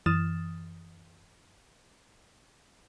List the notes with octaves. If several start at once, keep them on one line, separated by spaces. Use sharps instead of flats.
F#2 E3 D#6 F6 A6 E7